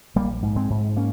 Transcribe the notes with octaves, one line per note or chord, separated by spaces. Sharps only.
A#1 G3 A#3
G#2
G#3 C4
G#2
A#3 C#4